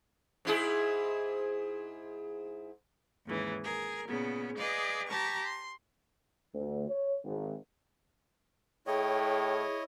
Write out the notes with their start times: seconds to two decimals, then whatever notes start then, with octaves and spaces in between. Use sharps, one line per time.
0.45 G#2 E4 G#4
3.26 D#2 G#2 C#3 E3
3.63 G#4 A#4
4.07 A#2 C#3 B3
4.57 G#4 B4 D5 D#5 F5
5.08 G4 A5 A#5 C#6
5.44 C6
6.53 D2
6.89 C#5
7.24 G#1
8.87 A2 E4 G#4 C#5 D#5 G5